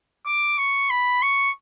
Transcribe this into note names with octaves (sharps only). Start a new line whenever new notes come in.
D6
C#6
B5
C#6